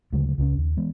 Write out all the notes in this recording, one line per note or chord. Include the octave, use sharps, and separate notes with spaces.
D2 C#3 F#3 G#3
C#2 C#3 C4 C#4
D#2
E3 G#3 B3